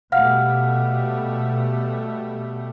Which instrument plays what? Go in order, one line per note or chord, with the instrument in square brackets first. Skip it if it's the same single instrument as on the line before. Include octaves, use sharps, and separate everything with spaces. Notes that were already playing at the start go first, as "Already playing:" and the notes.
[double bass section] B2 G3 A3 [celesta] F5 F#5 F6